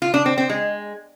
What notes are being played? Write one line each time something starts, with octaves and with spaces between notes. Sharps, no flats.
F4
D4
C4
C4
G#3